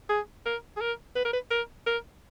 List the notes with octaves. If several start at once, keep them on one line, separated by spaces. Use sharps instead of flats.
G#4
A#4
G#4
A#4
B4
A#4
B4
A#4
A#4